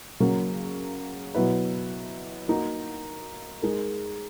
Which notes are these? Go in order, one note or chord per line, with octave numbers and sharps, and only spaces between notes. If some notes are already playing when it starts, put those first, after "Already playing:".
C#3 F#3 A#3
B2 F#3 B3 E4 B4
A#3 D#4 F#4 A#4
G#3 D#4 A#4